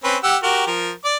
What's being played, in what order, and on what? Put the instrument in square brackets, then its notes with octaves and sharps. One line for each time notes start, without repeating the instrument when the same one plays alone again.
[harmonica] C4 C#4 B4
G4 F#5 E6
F#4 G4 A#4
F3 A#4
D5 D6